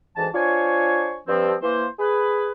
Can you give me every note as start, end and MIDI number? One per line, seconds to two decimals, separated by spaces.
0.16 0.28 38
0.16 0.28 44
0.16 0.28 52
0.16 0.28 81
0.34 1.18 62
0.34 1.18 65
0.34 1.18 72
0.34 1.18 73
0.34 1.18 80
0.34 1.18 85
1.28 1.54 43
1.28 1.54 53
1.28 1.54 60
1.62 1.86 52
1.62 1.86 58
1.62 1.86 72
1.99 2.52 68
1.99 2.52 71